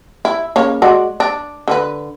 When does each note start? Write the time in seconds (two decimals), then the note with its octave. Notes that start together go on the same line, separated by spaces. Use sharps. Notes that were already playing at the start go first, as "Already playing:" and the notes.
0.25 E4
0.56 C#3 A#3 C#5
0.82 G#3 F#4 D5
1.20 D4
1.68 D3 D4 B4